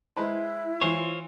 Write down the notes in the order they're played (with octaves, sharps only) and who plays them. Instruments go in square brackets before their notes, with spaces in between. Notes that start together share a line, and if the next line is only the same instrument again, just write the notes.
[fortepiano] G#3 B4 C5 [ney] E4
[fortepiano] E3 [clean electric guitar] F4 C5 C#5